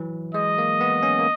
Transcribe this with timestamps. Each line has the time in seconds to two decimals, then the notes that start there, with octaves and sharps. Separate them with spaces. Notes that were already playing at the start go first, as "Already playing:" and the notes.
Already playing: E3 F#3
0.34 G#3 D#5
0.58 A#3
0.81 B3
1.03 C#4
1.19 A#3